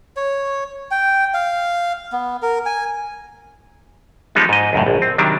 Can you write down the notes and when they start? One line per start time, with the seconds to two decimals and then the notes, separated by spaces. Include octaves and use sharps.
0.16 C#5
0.91 G5
1.34 F5
2.12 B3
2.42 A#4
2.66 G#5
4.35 F3 G3 G#3 B3 D#4
4.49 G#2 D#5
4.73 C#2 F#2 A2
4.87 A#1
5.02 C4
5.18 C3 D#3 F#3 G3 D4